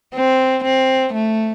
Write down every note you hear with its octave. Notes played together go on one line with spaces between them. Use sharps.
C4
C4
A3